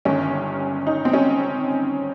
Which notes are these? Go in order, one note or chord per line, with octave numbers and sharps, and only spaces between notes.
G1 G2 D#3 G3 C#4
D#4
C4
C#4